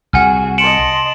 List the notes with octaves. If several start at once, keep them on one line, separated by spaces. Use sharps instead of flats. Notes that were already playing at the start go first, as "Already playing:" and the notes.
C2 F#4 G#4 F#5 G#5 F6
D#5 A5 C6 C#7 D7 E7 F#7